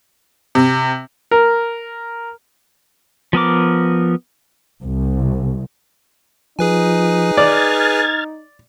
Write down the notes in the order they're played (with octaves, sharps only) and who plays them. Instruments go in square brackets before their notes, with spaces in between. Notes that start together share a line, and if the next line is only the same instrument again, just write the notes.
[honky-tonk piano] C3
[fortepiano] A#4
[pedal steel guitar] F3 B3 A#4 D6
[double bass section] C2
[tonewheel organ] F3 [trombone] D#4 [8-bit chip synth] G#4 B4 G#5
[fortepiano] D5 [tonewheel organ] F6 G#6 A6